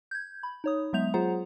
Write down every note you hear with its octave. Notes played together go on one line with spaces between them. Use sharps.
G6 G#6
B5
D#4 C#5 D#6
F#3 G#3 B3 E5 G6 F7
F#3 F4 G#4 C5 F#5 A#5